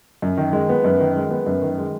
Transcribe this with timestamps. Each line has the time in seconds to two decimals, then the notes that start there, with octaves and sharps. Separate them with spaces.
0.22 F#2
0.37 D#3
0.53 G#3
0.69 B3
0.84 F#2
1.00 D#3
1.16 G#3
1.31 B3
1.46 F#2
1.62 D#3
1.78 G#3